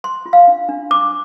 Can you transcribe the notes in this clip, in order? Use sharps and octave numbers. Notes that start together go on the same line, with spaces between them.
C5 C6
F4
F5
D4
D4
C5 D6